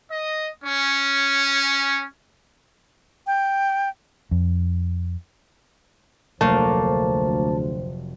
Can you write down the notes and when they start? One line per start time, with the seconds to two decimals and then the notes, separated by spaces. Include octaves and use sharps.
0.12 D#5
0.64 C#4
3.27 G5
4.31 F2
6.41 F1 D2 F#3 A3 A#3 C4 C5 A5